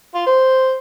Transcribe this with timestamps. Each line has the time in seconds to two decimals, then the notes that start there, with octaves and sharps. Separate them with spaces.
0.15 F4
0.26 C5